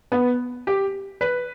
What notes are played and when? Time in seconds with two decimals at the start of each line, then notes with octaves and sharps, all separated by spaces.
0.12 B3
0.67 G4
1.21 B4